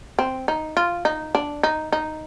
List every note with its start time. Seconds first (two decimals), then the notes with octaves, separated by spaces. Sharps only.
0.19 C4
0.48 D#4
0.77 F4
1.05 D#4
1.35 D4
1.63 D#4
1.92 D#4